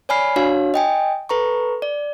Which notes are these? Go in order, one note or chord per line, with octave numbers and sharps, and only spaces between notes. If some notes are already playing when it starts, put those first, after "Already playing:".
C#5 D5 G#5 B5 F6 C7
D4 F#4 C#5 F5
D#5 G5 G#5
A4 B4 A#5 C#6
D5